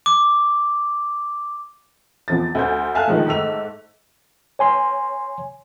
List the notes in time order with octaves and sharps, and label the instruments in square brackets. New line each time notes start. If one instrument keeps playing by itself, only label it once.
[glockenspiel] D6
[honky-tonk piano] E2 F3 A6
D2 C5 G6
E5 F5 G#5 A5 F6 F#6
G#2 D3 D#3 F3 G#3 A3
G#2 A3 E6 F7
[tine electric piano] C#5 G#5 C6